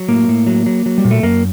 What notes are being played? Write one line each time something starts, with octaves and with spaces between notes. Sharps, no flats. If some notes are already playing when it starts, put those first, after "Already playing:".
Already playing: F#3
A2 A#3
A2
F#3
F#3
F#3
G3
A#2
A3
F#2 A#3